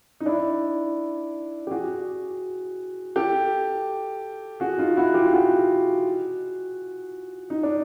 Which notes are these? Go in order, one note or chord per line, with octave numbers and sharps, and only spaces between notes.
D#4
D4 E4
G4
F#4 G#4
G4 A4
F#4 G#4
D#4 F4
E4 F#4
F4 G4
F#4 G#4
D#4
D4